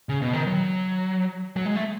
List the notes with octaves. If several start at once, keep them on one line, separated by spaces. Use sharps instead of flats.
C#3
B2
D#3
F#3
F#3
G#3
A3